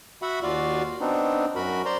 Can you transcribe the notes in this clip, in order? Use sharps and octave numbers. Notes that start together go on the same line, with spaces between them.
F#4 E5 F#5 B5
D#2 F4 F#4 D5 F5
B3 C4 D4 D#4
F#2 F#4 A#4 B5
C5 D5 A#5 C6